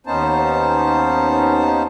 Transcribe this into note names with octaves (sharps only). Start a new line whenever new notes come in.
D#2 B3 C#4 D#4 C5 A5